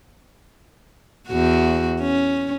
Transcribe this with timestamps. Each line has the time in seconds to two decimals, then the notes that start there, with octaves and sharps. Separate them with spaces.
1.29 E2 F#4
2.01 C#4